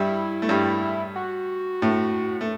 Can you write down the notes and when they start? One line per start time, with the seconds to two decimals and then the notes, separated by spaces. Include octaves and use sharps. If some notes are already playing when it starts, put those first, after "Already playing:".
Already playing: G2 G3 E4
0.42 A3
0.49 G2 G3
1.16 F#4
1.82 A2 A3
2.41 A3